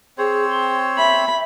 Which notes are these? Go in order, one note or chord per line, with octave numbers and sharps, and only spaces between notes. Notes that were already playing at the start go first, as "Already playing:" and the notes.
C4 G#4 C5 C#5
C6
E5 B5